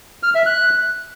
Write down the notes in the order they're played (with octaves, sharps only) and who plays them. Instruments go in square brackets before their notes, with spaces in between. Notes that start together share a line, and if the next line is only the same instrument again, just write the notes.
[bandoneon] F6
E5
F#6